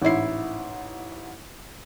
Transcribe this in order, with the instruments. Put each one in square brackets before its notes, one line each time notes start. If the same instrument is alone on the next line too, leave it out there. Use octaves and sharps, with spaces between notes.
[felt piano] A1 G#2 E4 C7